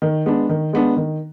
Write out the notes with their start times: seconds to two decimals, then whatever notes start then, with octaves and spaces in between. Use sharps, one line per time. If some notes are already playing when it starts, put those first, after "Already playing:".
0.02 D#3
0.26 G#3 B3 D4
0.49 D#3
0.73 G#3 B3 D4
0.97 D#3